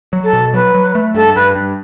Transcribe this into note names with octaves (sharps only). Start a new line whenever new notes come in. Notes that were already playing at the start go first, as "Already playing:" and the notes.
F#3
A4
B2
F#3 B4
F#3
A3
G2 A4
G2 B4
G2